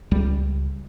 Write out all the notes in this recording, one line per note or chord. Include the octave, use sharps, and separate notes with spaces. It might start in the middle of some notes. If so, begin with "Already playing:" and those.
C#2 G3